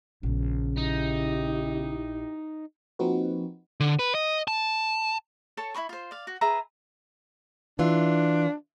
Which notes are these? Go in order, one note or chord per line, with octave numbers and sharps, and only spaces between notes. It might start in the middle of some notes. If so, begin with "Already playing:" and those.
A#1 C#3 B3
D#4 E4 G4
F3 A#3 C4 D#4 F#4 B4
D3
B4
D#5
A5
A4 C#5 A5
E4 B4 B5 C#6
F4 C5
D5 F5
F#4
G#4 B4 E5 A#5
E3 D4 F4